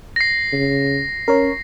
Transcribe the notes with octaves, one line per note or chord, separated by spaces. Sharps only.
A#6 C7
C#3
C#4 A#4 C#5